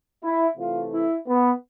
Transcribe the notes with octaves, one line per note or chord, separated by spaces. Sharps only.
E4
C3 E3 A3 F4
E4
B3